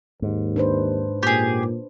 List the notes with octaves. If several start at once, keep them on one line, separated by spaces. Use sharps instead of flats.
D#2 G#2
D4 B4 C5
A#2 G4 G#4